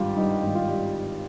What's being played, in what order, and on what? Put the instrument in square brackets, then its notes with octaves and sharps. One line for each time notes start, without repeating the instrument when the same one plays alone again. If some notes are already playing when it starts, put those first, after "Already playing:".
Already playing: [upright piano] G#1 G2 G3 F4 G4
G2 D#4
G#1
F4
G3